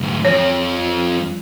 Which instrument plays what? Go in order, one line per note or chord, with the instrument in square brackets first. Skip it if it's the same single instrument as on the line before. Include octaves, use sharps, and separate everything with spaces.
[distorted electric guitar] D2 G#2
[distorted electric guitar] F2 F3 [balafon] C#5